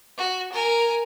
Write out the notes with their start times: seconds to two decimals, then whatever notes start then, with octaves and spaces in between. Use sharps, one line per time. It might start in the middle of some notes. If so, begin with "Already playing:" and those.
0.18 F#4
0.52 A#4 G#5